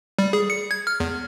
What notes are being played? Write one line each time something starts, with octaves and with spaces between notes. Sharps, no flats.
G3
G#4
C#7
G#6
F6
E2